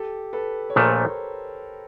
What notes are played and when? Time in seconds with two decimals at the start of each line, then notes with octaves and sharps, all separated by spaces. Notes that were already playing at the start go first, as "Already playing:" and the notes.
Already playing: G4 A4
0.33 A4 B4
0.70 C#5
0.76 A#1 A#2 F3 A3 A#4 C5